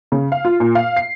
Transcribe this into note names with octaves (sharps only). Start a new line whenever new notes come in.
C#3
F5
F4
A#2
F5
C7